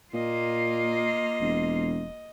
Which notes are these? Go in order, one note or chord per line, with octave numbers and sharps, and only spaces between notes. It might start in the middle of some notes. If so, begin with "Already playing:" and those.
A#2 A#3 F4 D#5
E1